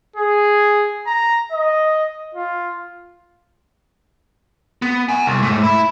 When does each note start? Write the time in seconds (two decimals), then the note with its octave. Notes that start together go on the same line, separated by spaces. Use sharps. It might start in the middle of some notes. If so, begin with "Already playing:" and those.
0.16 G#4
1.07 A#5
1.52 D#5
2.35 F4
4.82 B3
5.09 F#5 G#5
5.26 C2
5.42 G#2 A3
5.63 E4